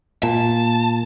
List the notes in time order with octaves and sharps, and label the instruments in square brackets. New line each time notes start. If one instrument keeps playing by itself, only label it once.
[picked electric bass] A#2 [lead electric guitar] A5